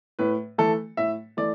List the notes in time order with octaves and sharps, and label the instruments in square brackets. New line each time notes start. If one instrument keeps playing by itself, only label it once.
[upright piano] A2 [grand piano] B4
[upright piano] E3 A3 [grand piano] A4
[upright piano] A2 [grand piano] E5
[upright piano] E3 A3 [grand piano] D5